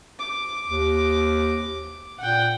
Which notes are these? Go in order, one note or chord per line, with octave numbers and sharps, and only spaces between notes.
D6
D#2
A#2 F#5 G5